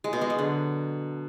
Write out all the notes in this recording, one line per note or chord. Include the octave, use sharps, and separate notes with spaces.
G#3
B2
G#3
F#3
D3